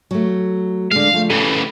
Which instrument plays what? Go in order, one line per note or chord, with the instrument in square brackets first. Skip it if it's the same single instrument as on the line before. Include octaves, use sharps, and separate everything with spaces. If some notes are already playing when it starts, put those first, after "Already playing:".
[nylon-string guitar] F#3 A3
[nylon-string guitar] D3 G#3 [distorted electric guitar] F5
[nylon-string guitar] F3 A3
[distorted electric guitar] C#3 E3 [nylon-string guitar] G4 A4